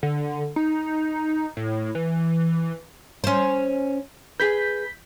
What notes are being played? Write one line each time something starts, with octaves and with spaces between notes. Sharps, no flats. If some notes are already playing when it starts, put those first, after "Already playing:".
D3
D#4
A2
E3
C#4 C5
G#4 B4 G6 B6